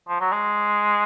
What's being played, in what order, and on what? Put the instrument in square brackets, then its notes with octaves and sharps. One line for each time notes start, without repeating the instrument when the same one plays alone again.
[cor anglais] F3
F#3
G#3